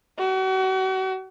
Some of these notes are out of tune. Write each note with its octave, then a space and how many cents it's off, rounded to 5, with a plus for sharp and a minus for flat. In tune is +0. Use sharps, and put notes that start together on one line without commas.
F#4 +40